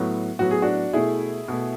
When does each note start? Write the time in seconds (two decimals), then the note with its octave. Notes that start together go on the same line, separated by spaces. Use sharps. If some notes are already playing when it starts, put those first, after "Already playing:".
Already playing: A2 F#3 B3
0.39 A2 F#3 B3 F#4
0.51 G#4
0.62 D4 F#4
0.93 B2 A3 E4 G#4
1.48 B2 A3